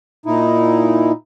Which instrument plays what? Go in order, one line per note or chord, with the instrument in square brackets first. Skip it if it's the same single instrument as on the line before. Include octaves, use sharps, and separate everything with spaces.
[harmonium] A#2 D#4 E4